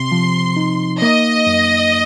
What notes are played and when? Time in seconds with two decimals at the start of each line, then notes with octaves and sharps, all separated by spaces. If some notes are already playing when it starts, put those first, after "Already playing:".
Already playing: C3 C4 C6
0.12 F3
0.56 D#4
1.01 A#3 D#5
1.47 F#2